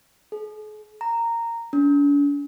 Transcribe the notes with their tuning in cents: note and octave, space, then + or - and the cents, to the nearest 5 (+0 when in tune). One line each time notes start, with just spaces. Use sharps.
G#4 +45
A#5 -10
D4 -45